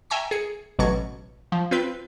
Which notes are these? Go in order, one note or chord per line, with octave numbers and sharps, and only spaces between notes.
E5 G5 G#5 A#5 C#6 B6
G#4 C#7
A1 B2 F#3 C#6 G#6 A6
F3
C4 F4 B4 G6